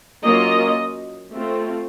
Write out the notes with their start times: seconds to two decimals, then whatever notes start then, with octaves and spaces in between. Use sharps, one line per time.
0.23 F#3 A#3 C#4 F4 D#5
1.32 A3 C4 F4